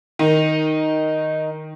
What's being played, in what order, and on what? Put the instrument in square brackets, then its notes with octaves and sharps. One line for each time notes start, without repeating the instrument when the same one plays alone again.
[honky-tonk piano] D#3 [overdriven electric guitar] D#4